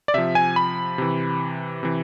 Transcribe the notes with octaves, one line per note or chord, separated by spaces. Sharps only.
D5
C3 F3 E5
G#5
B5
C3 E3
C3 E3